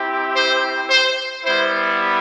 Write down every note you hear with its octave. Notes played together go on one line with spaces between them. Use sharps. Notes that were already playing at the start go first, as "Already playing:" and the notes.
Already playing: C4 E4 G4
C5
C5
G3 B3 E4 C5